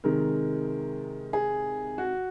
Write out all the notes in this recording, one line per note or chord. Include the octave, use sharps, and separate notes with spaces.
C3 D#3 G#3 A#4
G#4
F#4